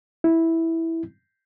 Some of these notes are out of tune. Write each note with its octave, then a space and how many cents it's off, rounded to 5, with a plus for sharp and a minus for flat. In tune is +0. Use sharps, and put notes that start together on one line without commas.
E4 -10